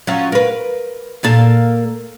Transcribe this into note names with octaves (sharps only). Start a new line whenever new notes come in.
F#3 C#4 F4
A#4 B4
A#2 A#3 A4